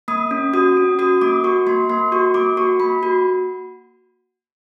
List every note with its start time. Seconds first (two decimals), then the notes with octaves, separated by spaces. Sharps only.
0.08 A#3 D#6
0.31 C#4
0.53 F#4 D#6
0.77 C#4
0.99 F#4 D#6
1.21 A#3 D6
1.44 F#4 C#6
1.67 A#3 C6
1.90 A#3 C6
2.12 F#4 C#6
2.34 A#3 D6
2.57 F#4 C#6
2.80 A#3 B5
3.03 F#4